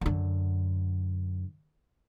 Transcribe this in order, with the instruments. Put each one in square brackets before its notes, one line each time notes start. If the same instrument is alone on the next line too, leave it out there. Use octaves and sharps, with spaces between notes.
[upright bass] F#2 D3